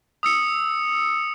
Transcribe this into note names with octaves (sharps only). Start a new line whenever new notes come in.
D#6 E6 C#7